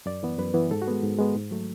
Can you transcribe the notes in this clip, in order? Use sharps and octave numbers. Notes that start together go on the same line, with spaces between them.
F#2 D5
E3 B3
F#2 B4
E3 B3
G#2 A4
F#4
G#3 B3
G#2
G#3 B3
G#2
F#3 A3